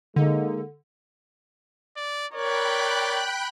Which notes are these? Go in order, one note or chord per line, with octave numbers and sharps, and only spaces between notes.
D3 G#3 A#3 D#4
D5
A#4 C#5 D5 G5 B5 F#6